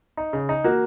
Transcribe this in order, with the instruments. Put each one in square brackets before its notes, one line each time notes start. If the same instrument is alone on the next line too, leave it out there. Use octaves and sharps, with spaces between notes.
[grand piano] D#4
C#3
D#4
[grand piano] A#3 [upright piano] F#4